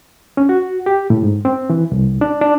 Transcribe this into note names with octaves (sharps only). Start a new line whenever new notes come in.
C#4
F#4
G4
A2
G#2
C4
E3
C2
D4
D4